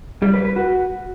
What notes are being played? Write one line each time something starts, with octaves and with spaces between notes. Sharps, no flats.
G3
B4
B4
F#4